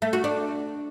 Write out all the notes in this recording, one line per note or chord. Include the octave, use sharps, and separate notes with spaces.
A3
F#4
D4